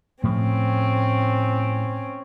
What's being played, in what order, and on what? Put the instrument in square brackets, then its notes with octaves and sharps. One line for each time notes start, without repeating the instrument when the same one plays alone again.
[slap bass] A2 F3 A3 [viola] C4 C#4